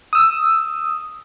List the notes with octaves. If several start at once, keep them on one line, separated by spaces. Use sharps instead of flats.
D#6 E6